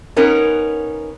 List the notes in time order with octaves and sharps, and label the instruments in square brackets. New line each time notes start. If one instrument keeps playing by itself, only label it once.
[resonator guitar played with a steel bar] B3 C#4 D#4 A#4